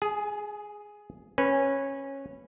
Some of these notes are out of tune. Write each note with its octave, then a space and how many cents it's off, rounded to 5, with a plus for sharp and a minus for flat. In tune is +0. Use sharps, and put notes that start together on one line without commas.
G#4 +0 G#5 +40
C#4 -15 B4 +0